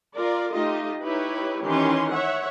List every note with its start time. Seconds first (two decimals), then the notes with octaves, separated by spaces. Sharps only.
0.16 F4 A#4 D5
0.51 A3 D#4 F4 G4 D#5
1.03 D#4 E4 G4 B4 C#5
1.62 D#3 E3 C#4 G4 C6
2.10 C#5 E5 F#5